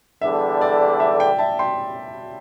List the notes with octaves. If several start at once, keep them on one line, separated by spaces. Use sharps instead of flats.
E2 D3 G3 D4 A4 E5
D5
E5
D5 G5
E5 A5
G5 C6